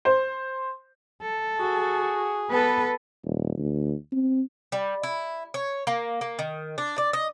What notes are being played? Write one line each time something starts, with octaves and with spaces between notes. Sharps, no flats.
C5
A4
F#4 G#4
B3 A4 B4
D#1
D2
C4
G3
E4
C#5
A#3
A#3
D#3
D4
D5
D#5